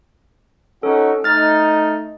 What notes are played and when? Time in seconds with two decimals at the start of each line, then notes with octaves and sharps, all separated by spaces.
0.83 C#4 D#4 F#4 A4
1.24 A3 D#4 F6 A6